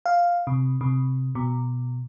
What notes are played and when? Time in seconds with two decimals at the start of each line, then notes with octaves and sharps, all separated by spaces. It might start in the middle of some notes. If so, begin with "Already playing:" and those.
0.06 F5
0.47 C3
0.81 C3
1.35 B2